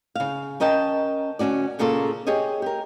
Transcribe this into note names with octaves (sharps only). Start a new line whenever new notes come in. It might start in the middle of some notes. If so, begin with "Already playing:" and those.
C#3 F5
C#4 A#4 D#5 G5 A5
D2 C3 C#4 F#4 D5
A#2 C#3 A#3 F4 A4
G4 G#4 C#5 D#5
G4 A#4